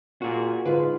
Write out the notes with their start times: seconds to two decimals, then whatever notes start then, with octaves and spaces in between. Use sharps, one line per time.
0.22 A#2 F#4 G#4
0.65 G#2 D3 F4 B4